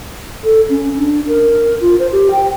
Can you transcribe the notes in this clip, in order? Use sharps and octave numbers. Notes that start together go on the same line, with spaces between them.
A4
C#4
D4
A#4
F4
C5
G4
G5